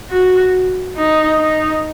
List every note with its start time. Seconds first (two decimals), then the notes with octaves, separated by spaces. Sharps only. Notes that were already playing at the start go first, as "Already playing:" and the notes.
0.10 F#4
0.97 D#4
1.39 D#4